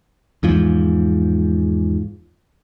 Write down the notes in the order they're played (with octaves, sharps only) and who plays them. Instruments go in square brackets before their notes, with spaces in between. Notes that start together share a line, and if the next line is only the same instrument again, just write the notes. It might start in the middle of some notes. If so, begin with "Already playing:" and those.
[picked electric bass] E2 G#2 F3